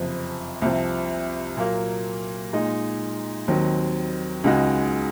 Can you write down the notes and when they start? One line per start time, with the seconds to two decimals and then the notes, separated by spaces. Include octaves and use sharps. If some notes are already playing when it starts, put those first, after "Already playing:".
Already playing: F#1 F2 C3 F3
0.62 C2 C3 F3
1.57 A#2 F#3 A#3
2.53 A#2 G#3 D#4
3.48 D#2 D#3 F#3 C4
4.44 C#2 C#3 G#3 D#4 F#4